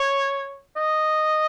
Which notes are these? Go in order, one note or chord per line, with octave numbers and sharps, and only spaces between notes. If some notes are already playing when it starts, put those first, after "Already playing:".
Already playing: C#5
D#5